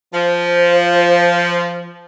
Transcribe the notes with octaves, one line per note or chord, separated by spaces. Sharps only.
F3 C5